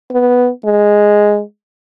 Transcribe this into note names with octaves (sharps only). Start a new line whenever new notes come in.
B3
G#3